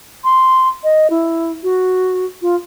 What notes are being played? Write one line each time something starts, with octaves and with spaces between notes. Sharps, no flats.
C6
D#5
E4
F#4
F4